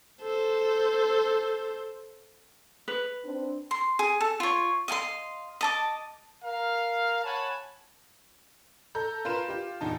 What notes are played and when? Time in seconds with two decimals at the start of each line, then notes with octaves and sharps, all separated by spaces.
0.22 A4 C5
2.88 B4
3.25 C4 D4
3.71 C6
3.99 G#4
4.21 A4
4.40 F4 C#5
4.88 D#5 F5 G#5 C6
5.61 D#5 A5 D6
6.44 A#4 F5
7.24 C#5 F#5 G#5 A5 B5
8.95 A4 A#5 G6
9.25 F4 A#4 B4 C6 E7
9.48 F4 G4
9.81 E2 A#2 D#4 A5